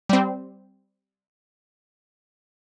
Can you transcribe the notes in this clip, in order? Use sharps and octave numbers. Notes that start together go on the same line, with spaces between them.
G3 C4